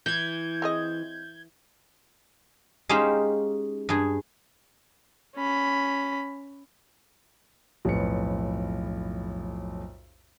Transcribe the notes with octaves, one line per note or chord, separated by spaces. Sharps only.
E3 G6 G#6
C4 G#4 D#5
G#3 C#4 D#4 G4 C5 F5
G2 G#4
C#4 B5
B1 F2 A2 B4 C#7